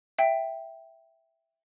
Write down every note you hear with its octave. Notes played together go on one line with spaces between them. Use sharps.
E5 G5